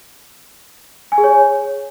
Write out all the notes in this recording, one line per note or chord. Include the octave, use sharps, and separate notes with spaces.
G#5
G#4
C#5